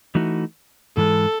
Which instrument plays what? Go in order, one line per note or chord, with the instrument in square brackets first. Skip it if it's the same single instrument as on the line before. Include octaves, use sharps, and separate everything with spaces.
[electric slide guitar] E3 A3 D#4 F#4
[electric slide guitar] G#2 E3 G#3 [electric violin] A4